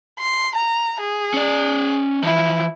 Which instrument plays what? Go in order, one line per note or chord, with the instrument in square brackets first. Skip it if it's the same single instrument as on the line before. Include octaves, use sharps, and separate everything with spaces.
[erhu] C6
A#5
G#4
[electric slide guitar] C#4 D5
[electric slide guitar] E3 F3 [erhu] E4